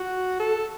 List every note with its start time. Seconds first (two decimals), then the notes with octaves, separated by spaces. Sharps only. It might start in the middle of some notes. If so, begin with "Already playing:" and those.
Already playing: F#4
0.39 A4